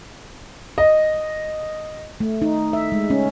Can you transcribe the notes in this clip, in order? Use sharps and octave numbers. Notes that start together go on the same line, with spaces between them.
D#5
A3
D#4
E5
G#3
C#4